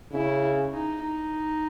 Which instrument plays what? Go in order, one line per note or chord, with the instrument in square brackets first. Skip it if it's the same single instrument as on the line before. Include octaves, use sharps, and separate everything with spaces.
[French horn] C#3 [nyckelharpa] E4
[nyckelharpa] D#4
D#4